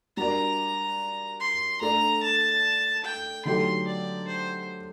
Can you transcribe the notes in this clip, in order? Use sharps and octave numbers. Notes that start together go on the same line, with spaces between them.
G3 D4 F#4 A#4 D5 A#5
C6
A3 D4 A4 D5 A#5
A5
G5
D3 F#3 A3 D#4 G4 C6
D5
C5